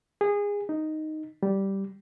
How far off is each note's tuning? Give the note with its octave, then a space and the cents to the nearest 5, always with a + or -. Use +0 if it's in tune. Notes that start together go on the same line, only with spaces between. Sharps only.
G#4 -25
D#4 -5
G3 -10